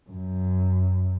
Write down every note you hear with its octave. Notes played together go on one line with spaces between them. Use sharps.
F#2